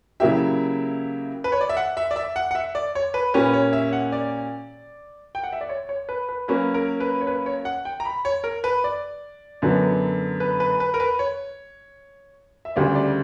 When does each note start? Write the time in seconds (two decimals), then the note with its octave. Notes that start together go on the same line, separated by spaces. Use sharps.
0.20 C#3 F#3 A#3 E4 G4 E5
1.44 B4
1.52 C#5
1.61 D5
1.69 E5
1.77 F#5
1.97 E5
2.11 D5
2.16 E5
2.36 F#5
2.51 F#5
2.55 E5
2.75 D5
2.95 C#5
3.14 B4
3.34 A#2 A#3 C#4 G4 B4
3.53 C#5
3.73 E5
3.93 F#5
4.12 D5
5.35 G5
5.43 F#5
5.53 E5
5.61 D5
5.69 C#5
5.89 C#5
6.09 B4
6.29 B4
6.48 F#3 A#3 C#4 B4
6.74 A#4
7.00 B4
7.21 C#5
7.27 B4
7.46 C#5
7.65 F#5
7.85 G5
8.00 A#5
8.05 B5
8.25 C#5
8.44 A#4
8.64 B4
8.84 D5
9.62 F#2 D3 F#3 B3
10.40 B4
10.60 B4
10.80 B4
10.94 A#4
11.00 B4
11.19 C#5
12.65 E5
12.76 D2 C#3 G3 D5
12.95 D5